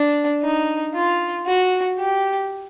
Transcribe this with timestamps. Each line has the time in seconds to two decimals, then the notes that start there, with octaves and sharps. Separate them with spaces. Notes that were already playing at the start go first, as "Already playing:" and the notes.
Already playing: D4
0.42 D#4
0.94 F4
1.46 F#4
1.98 G4